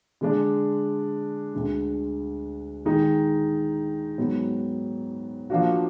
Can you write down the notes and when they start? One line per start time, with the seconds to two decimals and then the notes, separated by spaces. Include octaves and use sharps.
0.21 D3 G#3 D4
1.54 D2 D3 G#3
2.85 D#3 G#3 D#4
4.18 G#2 F#3 B3
5.50 F3 A#3 D4 F#4